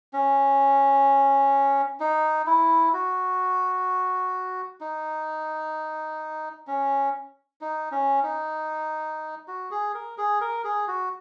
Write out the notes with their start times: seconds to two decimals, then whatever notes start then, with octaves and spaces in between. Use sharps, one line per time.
0.13 C#4
2.00 D#4
2.47 E4
2.93 F#4
4.80 D#4
6.67 C#4
7.61 D#4
7.92 C#4
8.23 D#4
9.48 F#4
9.71 G#4
9.94 A#4
10.18 G#4
10.41 A#4
10.64 G#4
10.88 F#4